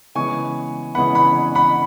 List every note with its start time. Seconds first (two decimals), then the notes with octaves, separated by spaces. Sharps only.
0.15 C#3 E3 G#3 B3 G#5 C#6
0.95 C#3 E3 G#3 B3 F#5 B5
1.15 F#5 B5
1.55 F#5 B5